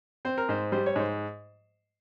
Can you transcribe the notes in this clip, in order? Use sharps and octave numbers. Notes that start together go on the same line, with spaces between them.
C4 C5
A#4
G#2 C5
G3 C5
C#5
G#2 C5